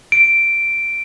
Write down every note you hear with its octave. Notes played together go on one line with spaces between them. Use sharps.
D7